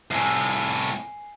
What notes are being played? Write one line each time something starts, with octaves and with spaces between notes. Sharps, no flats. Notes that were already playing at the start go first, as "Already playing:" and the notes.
C2 A2 G#5 C7